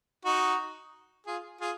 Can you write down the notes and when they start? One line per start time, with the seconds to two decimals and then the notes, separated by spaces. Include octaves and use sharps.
0.25 D#4 F#4
1.27 F4 G#4
1.61 F4 G#4